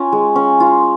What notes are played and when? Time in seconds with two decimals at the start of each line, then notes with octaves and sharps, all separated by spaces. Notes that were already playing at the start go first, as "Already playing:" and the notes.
Already playing: C#4 F4
0.12 G#3
0.36 C#4
0.60 F4